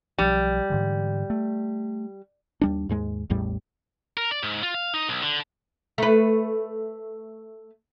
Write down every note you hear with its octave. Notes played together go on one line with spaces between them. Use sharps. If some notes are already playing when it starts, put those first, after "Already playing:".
B1 F3 G3
G#2 D3 E3
A3
D#2 G3 D4
D#2 G#2 G#3
A1 E2 A2 G3
A#4
D5
G#2
F4
F5
D#4
B1
D3
A3 B4